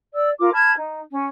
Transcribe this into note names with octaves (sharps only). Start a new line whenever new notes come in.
D5 E6
F4 A#4 D6
A5 B5 F6 G#6
D#4
C#4